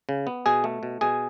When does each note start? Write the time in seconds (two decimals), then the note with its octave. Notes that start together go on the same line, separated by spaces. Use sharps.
0.09 C#3
0.27 B3
0.46 B2 G#4 G#5
0.64 A3
0.83 B2
1.01 B2 G#4 G#5